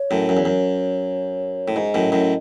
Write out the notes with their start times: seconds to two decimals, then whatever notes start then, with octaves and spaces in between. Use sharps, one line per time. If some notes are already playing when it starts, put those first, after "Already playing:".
Already playing: C#5
0.11 F#2 A2
0.29 F#2
0.37 E2
0.45 F#2
1.68 A2
1.76 G#2 D#5
1.94 F#2 A2
2.12 F#2 A2